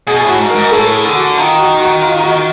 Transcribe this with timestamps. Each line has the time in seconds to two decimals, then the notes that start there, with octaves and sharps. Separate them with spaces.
0.07 B2 G#4
0.24 A2 F#4
0.39 G#2
0.50 A#4
0.55 G#2
0.72 A2 A4
0.94 G#4
1.05 D3
1.15 F#4
1.37 D#3 F4
1.59 F#4
1.80 F#4
2.02 F4
2.24 F#4